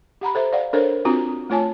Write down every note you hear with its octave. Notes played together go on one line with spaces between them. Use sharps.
G4 F#5 A#5 B5
A4 C5 E5
D5 F5 F#5
D4 A4 A#4 C5 C#5
C4 D4 F4 F#4 A#5
A3 F4 C#5 G#5 A5